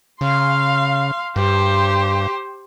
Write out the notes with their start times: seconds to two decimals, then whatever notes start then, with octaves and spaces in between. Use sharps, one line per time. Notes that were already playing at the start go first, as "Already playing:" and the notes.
0.21 C#3 F5 C6
1.36 G2 G4 C5